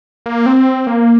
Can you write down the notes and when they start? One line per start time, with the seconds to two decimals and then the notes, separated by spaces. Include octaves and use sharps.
0.26 A#3
0.46 C4
0.87 A#3